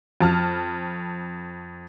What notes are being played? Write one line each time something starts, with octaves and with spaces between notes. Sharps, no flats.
F2 A5 F6